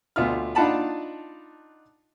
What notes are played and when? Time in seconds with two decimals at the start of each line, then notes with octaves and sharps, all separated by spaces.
0.16 D2 B2 F4 F6
0.55 D4 D#4 F4 F#5 A5 B5